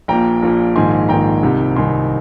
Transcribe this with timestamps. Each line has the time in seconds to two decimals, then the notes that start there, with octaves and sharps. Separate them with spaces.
0.08 A#1 A#2 G5 A#5
0.43 A#1 A#2
0.76 A#1 G#2 D#3 G#5 C6
1.09 A#1 G#2 D#3 G5 A#5
1.43 C2 C3 D#3
1.76 C2 C3 D#3 G#5 C6